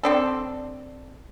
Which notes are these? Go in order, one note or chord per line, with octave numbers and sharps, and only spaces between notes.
C4 D4 A4